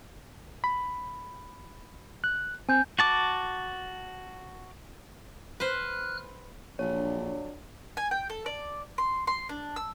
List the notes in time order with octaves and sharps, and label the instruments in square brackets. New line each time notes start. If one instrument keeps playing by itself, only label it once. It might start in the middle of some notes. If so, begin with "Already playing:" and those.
[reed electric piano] B5
F#6
[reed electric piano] C4 [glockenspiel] G#5 G6
[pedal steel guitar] F#4 A5 D6
[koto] B4 C5 [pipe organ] F6 F#6
[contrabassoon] A#1 [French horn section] F2 F#3 D4 [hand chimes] C#5
[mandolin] G#5
G5
A4
D5
C6
C6
D4
E6